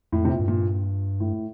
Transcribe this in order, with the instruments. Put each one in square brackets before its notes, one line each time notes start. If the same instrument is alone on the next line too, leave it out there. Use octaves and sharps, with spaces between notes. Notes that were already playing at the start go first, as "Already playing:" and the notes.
[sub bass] F2 [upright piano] A2
[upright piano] C3
A#2
[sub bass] G2
[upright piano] A#2
A2